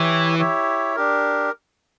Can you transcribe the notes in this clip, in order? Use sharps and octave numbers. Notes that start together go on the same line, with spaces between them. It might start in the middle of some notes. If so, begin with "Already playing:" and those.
Already playing: E3 E4 G4 C#5 E5
E4 G4 C#5 E5
D4 G4 A#4